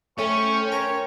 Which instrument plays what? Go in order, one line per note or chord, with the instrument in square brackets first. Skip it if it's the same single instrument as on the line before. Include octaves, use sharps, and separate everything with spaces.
[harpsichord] A3 [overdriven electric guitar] C#4 [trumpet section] C5 G5 [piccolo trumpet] C#6
[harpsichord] A#4 [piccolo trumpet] C#5